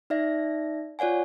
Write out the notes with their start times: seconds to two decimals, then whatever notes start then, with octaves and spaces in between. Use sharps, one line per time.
0.10 D#4 D5 E5 A#6
0.99 F4 C#5 D5 F#5 G#5